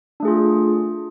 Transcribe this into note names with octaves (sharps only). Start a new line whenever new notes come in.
A3 D4 F4 G#4